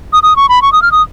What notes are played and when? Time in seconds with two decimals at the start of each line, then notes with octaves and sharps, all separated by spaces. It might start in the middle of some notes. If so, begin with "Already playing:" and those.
0.13 D#6
0.23 D#6
0.36 C#6
0.49 B5
0.62 C#6
0.72 D#6
0.82 F6
0.92 D#6